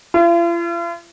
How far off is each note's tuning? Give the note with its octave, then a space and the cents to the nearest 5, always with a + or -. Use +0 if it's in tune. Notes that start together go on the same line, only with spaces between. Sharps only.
F4 -45